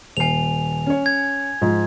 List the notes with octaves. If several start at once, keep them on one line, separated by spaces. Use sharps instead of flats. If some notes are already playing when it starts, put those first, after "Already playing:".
D#1 G#5 C7 F7
C#4 C#5
G#6
G#2 F3